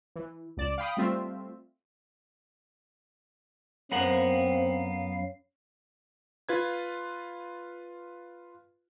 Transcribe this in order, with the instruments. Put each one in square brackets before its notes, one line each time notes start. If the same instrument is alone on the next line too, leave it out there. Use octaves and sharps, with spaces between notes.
[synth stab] E3
C#2 D5 E7
F5 G5 B5 D#6
G3 A3 C4 F4 E5
[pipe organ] F#2 F#3 F5 [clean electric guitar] B3 A#4 F#5 [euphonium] C4
[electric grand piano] F4 B4 G#6